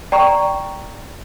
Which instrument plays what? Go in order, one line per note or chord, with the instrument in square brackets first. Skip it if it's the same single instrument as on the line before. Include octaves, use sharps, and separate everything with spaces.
[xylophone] D5 G5 A#5 C#6